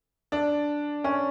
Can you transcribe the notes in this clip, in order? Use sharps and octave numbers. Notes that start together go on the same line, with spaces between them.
D4
C#4